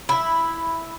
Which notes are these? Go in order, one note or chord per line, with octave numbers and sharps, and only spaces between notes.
E4